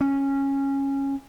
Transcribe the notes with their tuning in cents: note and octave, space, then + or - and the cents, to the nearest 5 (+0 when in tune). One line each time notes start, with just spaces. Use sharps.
C#4 -10